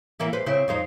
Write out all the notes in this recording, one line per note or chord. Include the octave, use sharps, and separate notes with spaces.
E3 A#3 E4
B4 C5
C#3 C4 E4
F2 D#4 C5